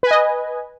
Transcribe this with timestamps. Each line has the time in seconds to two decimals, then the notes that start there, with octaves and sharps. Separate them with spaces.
0.03 B4
0.07 G#5
0.11 D#5